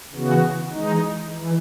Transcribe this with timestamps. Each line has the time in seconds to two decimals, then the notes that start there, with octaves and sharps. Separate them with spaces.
0.13 C#3 E3 B3 F#4
0.72 E3 G#3 D#4
1.30 E3